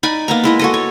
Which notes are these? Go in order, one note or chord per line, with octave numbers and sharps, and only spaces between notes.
D#4 D5 G#5 B5
A#3 B3 A#5
G#3 E4 D#5
F#4 A4 D#5
C#5